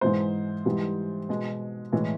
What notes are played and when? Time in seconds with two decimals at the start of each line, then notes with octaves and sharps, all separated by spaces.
0.01 G#2 E3 G#3 C5
0.65 G#2 E3 G3
1.29 B2 G#3
1.92 A2 E3 G#3